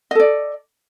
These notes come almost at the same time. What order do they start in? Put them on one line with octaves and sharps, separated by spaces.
D#5 A4 D5